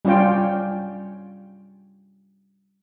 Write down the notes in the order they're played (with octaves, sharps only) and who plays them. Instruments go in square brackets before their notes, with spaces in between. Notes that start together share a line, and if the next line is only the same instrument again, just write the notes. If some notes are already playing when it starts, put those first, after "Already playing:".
[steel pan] G3 C#4 F4 C#5 G5